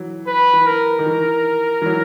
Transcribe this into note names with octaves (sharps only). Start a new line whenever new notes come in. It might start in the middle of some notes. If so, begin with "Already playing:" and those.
Already playing: E3 F#3
B4
E3
A#4
D#3
E3
E3
F#3